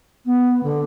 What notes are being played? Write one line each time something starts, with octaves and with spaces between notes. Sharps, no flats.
B3
D3